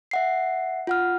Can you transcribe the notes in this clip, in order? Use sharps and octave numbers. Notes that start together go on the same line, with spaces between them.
E5 F#5 C7
F4 F#5 F6